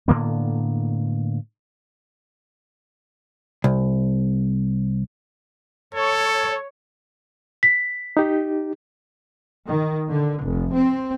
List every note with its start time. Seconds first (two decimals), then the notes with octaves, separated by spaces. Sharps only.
0.08 A2 D3 A#3 B3
3.64 C2
5.94 A4 C#5
7.63 B6
8.17 D#4 G4
9.68 D#3
10.10 D3
10.45 F1
10.74 C4